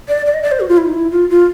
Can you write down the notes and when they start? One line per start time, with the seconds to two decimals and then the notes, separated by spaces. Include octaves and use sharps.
0.08 D5
0.26 D5
0.34 D#5
0.42 D5
0.52 C5
0.60 F#4
0.69 F4
0.78 E4
0.86 D#4
0.94 E4
1.11 F4
1.30 F4